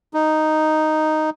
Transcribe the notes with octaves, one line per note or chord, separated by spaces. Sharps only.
D#4